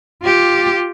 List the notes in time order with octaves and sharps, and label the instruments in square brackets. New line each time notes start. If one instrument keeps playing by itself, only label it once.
[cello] F4 G4